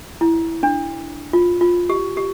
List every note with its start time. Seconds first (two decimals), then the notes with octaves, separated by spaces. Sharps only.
0.21 E4
0.63 D4
1.33 F4
1.61 F4
1.89 G4
2.17 G4